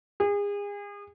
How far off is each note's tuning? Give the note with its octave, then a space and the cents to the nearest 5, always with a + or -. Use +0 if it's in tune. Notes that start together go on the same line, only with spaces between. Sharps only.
G#4 -35